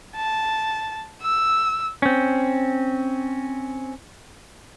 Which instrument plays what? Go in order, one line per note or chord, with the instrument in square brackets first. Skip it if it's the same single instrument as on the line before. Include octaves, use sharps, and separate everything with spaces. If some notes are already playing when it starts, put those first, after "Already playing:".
[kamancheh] A5
E6
[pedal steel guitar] C4 C#4